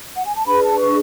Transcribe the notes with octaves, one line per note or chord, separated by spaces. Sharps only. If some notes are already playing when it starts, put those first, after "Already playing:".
F#5
G#5
A5
D4 G#4 B4 B5
A5
C#6